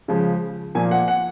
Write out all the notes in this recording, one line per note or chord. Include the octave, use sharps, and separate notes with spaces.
C#3 F3 G#3
A#2 F3 A#3 G#5
F#5
F#5